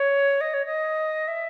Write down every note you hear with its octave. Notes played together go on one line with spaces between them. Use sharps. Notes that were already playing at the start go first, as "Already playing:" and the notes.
Already playing: C#5
D#5
C#5
D#5
E5